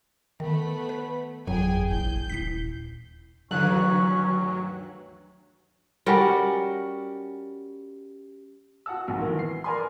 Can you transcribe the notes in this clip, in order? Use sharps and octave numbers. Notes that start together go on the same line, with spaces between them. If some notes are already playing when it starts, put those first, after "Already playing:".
D#3 A3 B3 B5
B4
G1 F2 F#3 G#4 G5 G#5
A#1 E4 G6
D#1 E4 B6 C7
D2 G2 D#3 E3 F#3 C#4 F#6
G3 C#4 F#4 A#4
F#4 F#5 A5 E6
A#1 G#2 C3 F#4
D#3 E3
C7
A#4 B4 D5 G#5 B5 C6